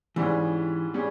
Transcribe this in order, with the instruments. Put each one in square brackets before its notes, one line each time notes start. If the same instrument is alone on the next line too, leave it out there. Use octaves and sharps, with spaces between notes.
[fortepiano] G#2 G3 C#4 G#4 [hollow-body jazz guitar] E3
[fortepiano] G3 C#4 G#4